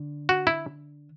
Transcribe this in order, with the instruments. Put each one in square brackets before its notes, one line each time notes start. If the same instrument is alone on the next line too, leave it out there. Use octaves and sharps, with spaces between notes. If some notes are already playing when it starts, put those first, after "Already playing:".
Already playing: [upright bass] D3
[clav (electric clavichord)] F#4
E4